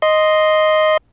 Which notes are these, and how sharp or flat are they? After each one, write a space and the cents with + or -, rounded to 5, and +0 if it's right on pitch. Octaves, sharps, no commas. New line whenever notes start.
D#5 +0 C6 +0